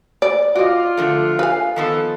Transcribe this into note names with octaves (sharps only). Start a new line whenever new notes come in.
D5
F4 F#4 D5 D#5
D3 F3 A3
B4 F5 G#5
D#3 F3 B3 A4